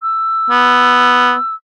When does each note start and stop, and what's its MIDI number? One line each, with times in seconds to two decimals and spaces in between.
0.02 1.54 88
0.50 1.35 59